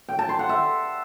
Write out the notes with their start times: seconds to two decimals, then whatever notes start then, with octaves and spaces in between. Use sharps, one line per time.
0.09 G5
0.19 A5
0.29 C6
0.39 F#5
0.49 E5